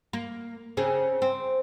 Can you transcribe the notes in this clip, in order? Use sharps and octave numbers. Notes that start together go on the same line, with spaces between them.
A#3
C#3 C4 G#4
C4